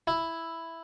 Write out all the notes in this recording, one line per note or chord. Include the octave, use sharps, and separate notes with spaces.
E4